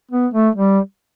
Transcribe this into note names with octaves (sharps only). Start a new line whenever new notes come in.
B3
A3
G3